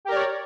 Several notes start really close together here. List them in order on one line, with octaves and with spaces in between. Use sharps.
G4 A#4 D5 C#5